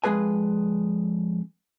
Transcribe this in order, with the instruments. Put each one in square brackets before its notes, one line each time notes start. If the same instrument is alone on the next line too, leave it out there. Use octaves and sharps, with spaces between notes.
[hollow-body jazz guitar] F2 G#3 G#4 B4 G#5